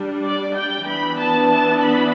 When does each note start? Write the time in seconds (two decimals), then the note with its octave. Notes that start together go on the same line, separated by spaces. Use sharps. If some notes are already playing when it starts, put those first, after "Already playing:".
Already playing: G3 D4
0.25 D5
0.57 G5
0.88 E3 B3 D4 B5
1.20 A5
1.51 A5
1.82 B5